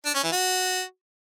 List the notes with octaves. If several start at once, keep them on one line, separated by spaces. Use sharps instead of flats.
D4
C#4
E3
F#4